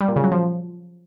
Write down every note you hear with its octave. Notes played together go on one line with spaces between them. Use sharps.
G3
A#2
C#3
F#3
F3